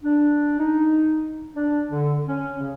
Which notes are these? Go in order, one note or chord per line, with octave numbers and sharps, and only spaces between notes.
D4
D#4
D4
D3
C#4
C#3